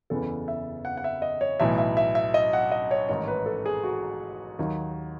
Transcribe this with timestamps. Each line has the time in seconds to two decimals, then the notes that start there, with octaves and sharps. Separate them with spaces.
0.10 F#1 E2 C#3 E3 A4
0.48 E5
0.85 F#5
0.97 F#5
1.04 E5
1.22 D#5
1.41 C#5
1.60 B1 A2 E3 E5
1.78 E5
1.97 E5
2.15 E5
2.34 D#5
2.53 F#5
2.72 D#5
2.91 C#5
3.09 A1 G#2 D#3 C#5
3.28 B4
3.46 A4
3.66 G#4
3.83 F#4
4.59 D#2 D#3 F#3